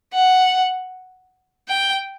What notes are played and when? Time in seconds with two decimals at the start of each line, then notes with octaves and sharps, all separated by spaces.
0.14 F#5
1.68 G5